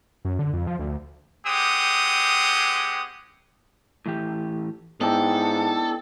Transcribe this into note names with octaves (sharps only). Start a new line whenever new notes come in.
F#2
D3
F2
F3
D2
G#3 C4 G4 F#5 D#6
A2 E3 G4
G#2 B3 D4 E4 A4 D#5 G5 A5